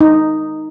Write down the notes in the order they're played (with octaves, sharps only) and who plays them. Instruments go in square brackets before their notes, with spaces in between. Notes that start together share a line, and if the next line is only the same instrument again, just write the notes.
[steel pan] D#4